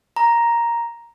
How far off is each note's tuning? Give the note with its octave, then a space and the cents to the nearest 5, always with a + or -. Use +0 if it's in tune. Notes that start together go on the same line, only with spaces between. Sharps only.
A#5 +5